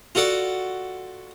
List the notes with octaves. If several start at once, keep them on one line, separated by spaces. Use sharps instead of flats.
F4 F#4 A4 D5